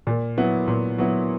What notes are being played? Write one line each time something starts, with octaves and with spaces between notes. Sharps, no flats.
A#2
F#3 B3 E4
A#2
F#3 B3 E4